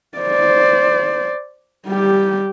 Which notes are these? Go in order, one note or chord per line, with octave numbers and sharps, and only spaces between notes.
C5 D5
G3 G4